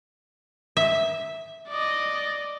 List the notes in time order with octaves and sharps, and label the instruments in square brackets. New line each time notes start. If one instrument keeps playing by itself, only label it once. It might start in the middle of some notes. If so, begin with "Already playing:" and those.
[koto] E5
[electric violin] D5 D#5